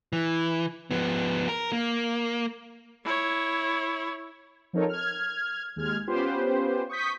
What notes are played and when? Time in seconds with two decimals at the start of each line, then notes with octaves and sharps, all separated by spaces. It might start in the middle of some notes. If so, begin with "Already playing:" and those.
0.13 E3
0.91 F3 B3
1.49 A#4
1.73 A#3
3.04 E4 C#5
4.73 F3 C4 D#4 A4 A#4 C#5
4.89 F6 G#6
5.76 D#2 G#3 F6 G#6
6.07 B3 C#4 F4 G4 B4 C5
6.89 C#6 D#6 G6 B6